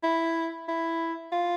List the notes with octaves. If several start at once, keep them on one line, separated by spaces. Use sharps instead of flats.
E4
E4
F4